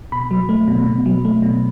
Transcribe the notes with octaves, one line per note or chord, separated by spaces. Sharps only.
B2 B5
F#3
A3
B2
B2
F#3
A3
B2